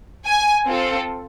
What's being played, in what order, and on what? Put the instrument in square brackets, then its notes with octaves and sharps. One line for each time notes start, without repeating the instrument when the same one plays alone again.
[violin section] G#5
C4 F4 A4